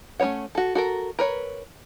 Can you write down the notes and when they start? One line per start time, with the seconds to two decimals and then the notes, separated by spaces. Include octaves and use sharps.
0.20 A3 C#4 E4 C#5 F#5
0.55 F#4 A4
0.75 F#4 A4 A#4
1.19 A#4 B4 C#5